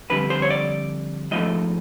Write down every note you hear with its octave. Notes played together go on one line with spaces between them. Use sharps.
F2 D3 G3 B4
C5
C#5
D5
G#2 F3 A3 D#5